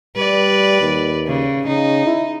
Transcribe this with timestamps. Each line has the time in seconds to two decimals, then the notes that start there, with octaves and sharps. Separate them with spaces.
0.16 G3 B4 D5
0.81 D#2
1.27 C#3
1.67 C#3 D#4
2.06 E4